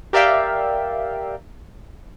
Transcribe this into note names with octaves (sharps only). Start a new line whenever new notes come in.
G4 A#4 D5 E5 F5 G5